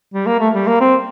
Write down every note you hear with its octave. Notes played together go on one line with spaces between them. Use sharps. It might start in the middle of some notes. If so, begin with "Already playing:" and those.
G3
A#3
A3
G3
A#3
C4